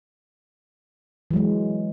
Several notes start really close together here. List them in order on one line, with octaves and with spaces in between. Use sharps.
E3 F#3 G#3